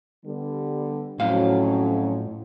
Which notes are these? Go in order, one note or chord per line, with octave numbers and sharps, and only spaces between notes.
D3 G3 B3
F2 A2 F#3 C#4 F5